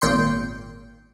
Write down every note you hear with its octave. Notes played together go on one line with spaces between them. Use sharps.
G#1 A#2 G5 C6 C#7